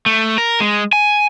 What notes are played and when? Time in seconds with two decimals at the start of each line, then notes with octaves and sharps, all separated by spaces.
0.06 A3
0.38 A#4
0.60 G#3
0.93 G#5